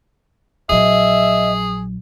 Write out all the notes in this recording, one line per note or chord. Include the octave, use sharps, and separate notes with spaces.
A#1 F#3 G#4 D#5 E5